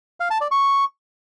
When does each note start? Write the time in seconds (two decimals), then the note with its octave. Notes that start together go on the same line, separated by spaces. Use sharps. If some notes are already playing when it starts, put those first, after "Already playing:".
0.20 F5
0.31 A5
0.41 D5
0.51 C#6